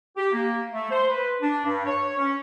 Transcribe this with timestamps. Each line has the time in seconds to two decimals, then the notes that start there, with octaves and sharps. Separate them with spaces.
0.17 G4
0.32 A#3
0.72 A3
0.91 C5
1.08 B4
1.41 D4
1.65 G2
1.86 C#5
2.18 C#4